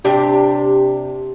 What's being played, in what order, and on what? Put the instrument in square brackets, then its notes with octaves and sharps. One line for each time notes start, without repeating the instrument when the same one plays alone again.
[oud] C3 D4 G4